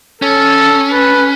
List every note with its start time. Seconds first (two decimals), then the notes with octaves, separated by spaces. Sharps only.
0.22 C#4 A4
0.93 B4